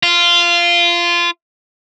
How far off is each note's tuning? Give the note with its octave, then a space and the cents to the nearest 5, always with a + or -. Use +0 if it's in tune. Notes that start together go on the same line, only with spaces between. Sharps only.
F4 -15